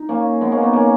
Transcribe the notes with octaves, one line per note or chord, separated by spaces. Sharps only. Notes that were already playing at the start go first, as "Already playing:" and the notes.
Already playing: D#4
A#3 C#4
G#3 B3
A#3 C#4
B3 D#4
A#3 C#4